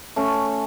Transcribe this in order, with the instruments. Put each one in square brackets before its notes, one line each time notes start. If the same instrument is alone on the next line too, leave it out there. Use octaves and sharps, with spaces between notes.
[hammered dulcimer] A3 C#4